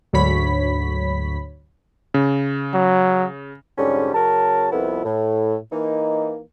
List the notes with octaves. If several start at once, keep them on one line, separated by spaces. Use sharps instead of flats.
D2 G#2 F#3 C#5 B5 B6
C#3
F#3
F2 G#2 D3 G3 C#4
F#2 C#3 F#3 A#4 A5
C2 F2 B3 E4
A2
E3 A#3 D#4